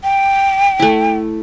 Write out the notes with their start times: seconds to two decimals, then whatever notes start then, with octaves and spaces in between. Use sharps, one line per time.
0.04 G5
0.80 A3 E4